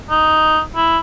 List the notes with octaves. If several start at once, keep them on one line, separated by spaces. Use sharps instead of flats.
D#4
E4